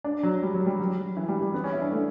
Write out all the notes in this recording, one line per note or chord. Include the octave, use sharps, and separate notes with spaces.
D4
F#3
G3
F#3
G3
F#3
E3
G3
G3
B3
C#4
E4
D4
A3